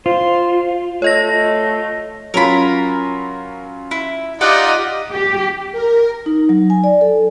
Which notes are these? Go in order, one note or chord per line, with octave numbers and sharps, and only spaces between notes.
F4 C5
A3 C#5 D#5 A#6
F#3 C#4 F4 A#4 B5
E4
D#4 F4 G4 D5 F#5
G4
A#4
D#4
F#3
G#5
D5
A4